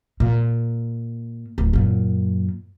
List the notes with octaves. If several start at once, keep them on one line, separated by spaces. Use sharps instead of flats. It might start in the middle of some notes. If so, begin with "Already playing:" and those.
A#2
D1
F#2 A#2